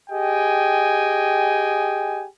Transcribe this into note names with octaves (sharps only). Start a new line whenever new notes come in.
G4 G#4 D#5 G5 G#5